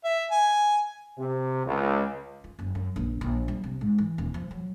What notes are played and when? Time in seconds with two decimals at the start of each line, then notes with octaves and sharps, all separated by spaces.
0.04 E5
0.31 G#5
1.18 C3
1.65 C#2
2.44 F4
2.59 F#1
2.75 F#2
2.96 A#1
3.21 A#1
3.48 G3
3.64 C3
3.81 G#2
3.98 E3
4.18 D#1
4.34 F3
4.51 F#3